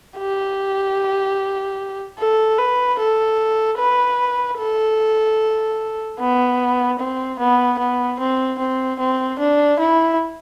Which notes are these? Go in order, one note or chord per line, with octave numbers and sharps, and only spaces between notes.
G4
A4
B4
A4
B4
A4
B3
C4
B3
B3
C4
C4
C4
D4
E4